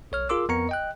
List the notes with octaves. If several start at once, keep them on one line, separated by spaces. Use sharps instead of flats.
B1 C#5 F6
F4 G#4 A#4 C6 D6 E6
F2 B3 A#4 A#5 C#6 C#7
D#5 G5 F#6